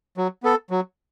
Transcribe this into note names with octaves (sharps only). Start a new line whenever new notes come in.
F#3
B3 A4
F#3